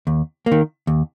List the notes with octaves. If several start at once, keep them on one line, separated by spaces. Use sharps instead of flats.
D#2
A#3
D#3
D#2